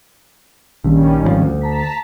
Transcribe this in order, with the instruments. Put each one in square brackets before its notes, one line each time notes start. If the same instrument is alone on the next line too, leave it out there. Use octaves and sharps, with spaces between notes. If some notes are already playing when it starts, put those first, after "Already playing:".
[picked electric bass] A#1 [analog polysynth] D#3 G3 C#4
[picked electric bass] G#1 C#3 F3
D2
[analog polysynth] A5 A#5 B6